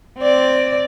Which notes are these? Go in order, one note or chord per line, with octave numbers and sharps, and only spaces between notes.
C4 D5